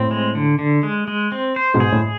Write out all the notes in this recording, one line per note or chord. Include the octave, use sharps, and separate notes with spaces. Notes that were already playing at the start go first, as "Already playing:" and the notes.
Already playing: A2 C4
G#3
D3
D3
G#3
G#3
C4
C5
G#2 B2
G#4
A2